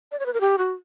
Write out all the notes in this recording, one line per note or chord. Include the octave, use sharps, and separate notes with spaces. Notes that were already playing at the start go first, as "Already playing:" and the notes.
D5
C#5
B4
A#4
G4
F#4